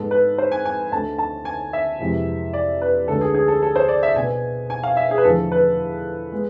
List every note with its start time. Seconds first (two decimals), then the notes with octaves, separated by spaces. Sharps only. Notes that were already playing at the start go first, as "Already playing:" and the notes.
Already playing: G#2 G#3 B3 A4
0.11 B4
0.38 C5
0.52 G#5
0.65 G#5
0.92 D2 D3 A3 A5
1.18 A5
1.45 G#5
1.73 E5
2.00 F2 C3 E3 G#3
2.53 D5
2.81 B4
3.07 D2 D3 G#3 B3 A4
3.21 G#4
3.34 G#4
3.48 A4
3.62 A4
3.75 C5
3.88 D5
4.03 E5
4.16 B2 B3 G#5
4.70 G#5
4.83 F5
4.97 E5
5.11 G#4
5.18 B4
5.24 E2 D3 F3 A3 A4
5.51 B4
6.32 G#3 B3